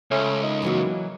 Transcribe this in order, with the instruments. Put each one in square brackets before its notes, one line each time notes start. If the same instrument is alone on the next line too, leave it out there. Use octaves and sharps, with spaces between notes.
[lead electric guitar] C#2 [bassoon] A3 [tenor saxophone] C#4
[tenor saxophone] D#3 [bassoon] D#4
[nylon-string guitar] E3 F#3 A#3